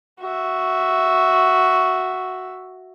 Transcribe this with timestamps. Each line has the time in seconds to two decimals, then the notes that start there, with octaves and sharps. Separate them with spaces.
0.20 F#4 E5